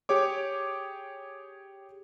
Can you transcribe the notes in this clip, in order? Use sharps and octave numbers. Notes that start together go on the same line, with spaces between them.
G4 G#4 C#5 D6